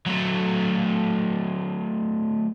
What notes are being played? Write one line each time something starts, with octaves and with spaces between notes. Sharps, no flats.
F#3 A3